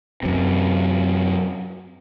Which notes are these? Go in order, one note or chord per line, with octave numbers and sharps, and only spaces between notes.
F#2 C3